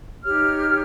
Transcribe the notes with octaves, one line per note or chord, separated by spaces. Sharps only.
D#4 G4 C#5 F6